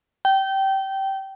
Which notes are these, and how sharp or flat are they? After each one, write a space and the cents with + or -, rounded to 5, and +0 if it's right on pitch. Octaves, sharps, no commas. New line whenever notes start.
G5 -20